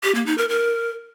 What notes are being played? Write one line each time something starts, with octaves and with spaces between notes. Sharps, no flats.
G4
A#3
D#4
A#4
A#4